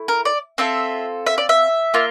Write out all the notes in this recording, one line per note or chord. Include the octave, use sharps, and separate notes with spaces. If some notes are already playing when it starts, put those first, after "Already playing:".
Already playing: A3 E4
A#4
D5
C4 F4 A4 E5
E5
D5
E5
A#3 F4